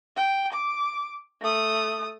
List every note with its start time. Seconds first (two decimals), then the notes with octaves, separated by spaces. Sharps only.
0.16 G5
0.53 D6
1.41 A3 D#6